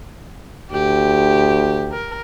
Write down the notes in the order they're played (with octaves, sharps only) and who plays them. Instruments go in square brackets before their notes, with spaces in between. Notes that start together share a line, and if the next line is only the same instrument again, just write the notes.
[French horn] D2 [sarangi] G4
[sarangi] A#4